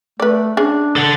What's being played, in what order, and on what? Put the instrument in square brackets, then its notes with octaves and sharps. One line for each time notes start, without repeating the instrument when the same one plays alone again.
[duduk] A3 [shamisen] B4 D5
[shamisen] C#4 G#4 [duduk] D4
[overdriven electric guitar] A4 F#5